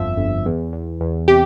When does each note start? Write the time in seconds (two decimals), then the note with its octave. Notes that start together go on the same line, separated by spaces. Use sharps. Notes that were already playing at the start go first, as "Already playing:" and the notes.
Already playing: G1 F2 F3 E5
0.17 G1
0.46 E2
0.73 E2
1.01 E2
1.28 C3 G4